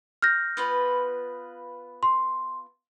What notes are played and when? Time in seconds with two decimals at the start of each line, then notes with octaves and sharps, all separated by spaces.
0.22 F6 G6 A#6
0.57 B3 F4 B4
2.03 C6